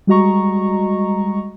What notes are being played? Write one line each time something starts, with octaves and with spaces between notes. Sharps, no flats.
G3 G#3 F#4 D#5 A#5 C#6